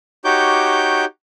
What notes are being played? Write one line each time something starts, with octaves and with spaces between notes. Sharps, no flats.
D#4 F#4 G4 C#5 D6 G6